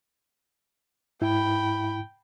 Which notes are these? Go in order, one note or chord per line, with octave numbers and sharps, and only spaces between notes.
G#2 E4 G5 B5